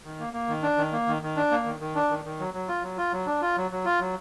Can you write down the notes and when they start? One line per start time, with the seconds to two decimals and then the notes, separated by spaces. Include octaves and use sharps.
0.04 D#3
0.20 A#3
0.33 A#3
0.48 D#3
0.63 D4
0.77 D#3
0.93 A#3
1.07 D#3
1.22 D#3
1.36 D4
1.51 A#3
1.66 D#3
1.80 D#3
1.95 D4
2.10 D#3
2.25 D#3
2.40 F#3
2.54 F#3
2.68 F4
2.83 F#3
2.98 F4
3.12 F#3
3.27 D4
3.42 F4
3.56 F#3
3.71 F#3
3.85 F4
4.00 F#3